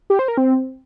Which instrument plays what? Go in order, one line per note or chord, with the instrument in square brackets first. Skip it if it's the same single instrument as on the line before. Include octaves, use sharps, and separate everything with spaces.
[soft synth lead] G4
C5
A#4
C4